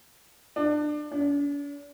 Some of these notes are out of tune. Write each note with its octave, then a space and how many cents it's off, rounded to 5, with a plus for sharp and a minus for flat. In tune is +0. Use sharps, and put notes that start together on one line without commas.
D4 +25
D4 -45